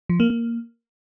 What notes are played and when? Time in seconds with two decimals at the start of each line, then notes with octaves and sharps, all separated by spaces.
0.09 F3
0.20 A#3
0.30 A#3